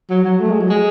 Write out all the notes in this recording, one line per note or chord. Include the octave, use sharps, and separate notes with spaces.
F#3
F#3
A3
G#3
F#3
G#3